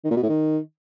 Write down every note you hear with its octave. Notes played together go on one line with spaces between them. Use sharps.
D#3
A#2
B2
A2
D#3